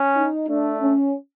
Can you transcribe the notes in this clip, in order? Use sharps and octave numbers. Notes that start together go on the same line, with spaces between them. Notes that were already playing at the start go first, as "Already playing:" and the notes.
Already playing: C#4
D#4
A3 D4
C#4